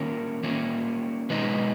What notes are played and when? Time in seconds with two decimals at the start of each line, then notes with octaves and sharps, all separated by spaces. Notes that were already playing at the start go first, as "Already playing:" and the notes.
Already playing: D#3 A#3 C#4 A#4 C#5
0.43 D#3 A#3 C#4
1.30 B2 G#3 D#4 B4 D#5